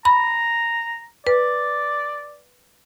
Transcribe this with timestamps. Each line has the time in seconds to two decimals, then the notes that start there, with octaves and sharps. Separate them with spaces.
0.05 A#5 B5
1.27 B4 D5